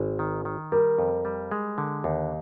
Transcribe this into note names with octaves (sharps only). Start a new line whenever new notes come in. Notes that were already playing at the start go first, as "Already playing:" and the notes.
Already playing: G#1
D#3
D#3
G3 A#4
F2
G3
G#3
D3
D#2